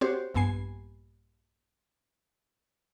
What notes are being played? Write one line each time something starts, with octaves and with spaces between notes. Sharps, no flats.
C4 F#4 G4 C5 C#5
A#1 G2 B3 G#5 C7